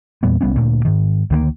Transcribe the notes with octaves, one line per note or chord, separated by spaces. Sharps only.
E2 A#2 G3 B3
C2 G3 B3 C#4
D2 A#2
G#2 D#3
D2 D#3 F#3 A#3